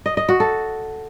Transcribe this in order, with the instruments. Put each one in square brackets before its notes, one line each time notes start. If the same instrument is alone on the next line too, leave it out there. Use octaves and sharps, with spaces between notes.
[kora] D#5
D#5
F#4
A4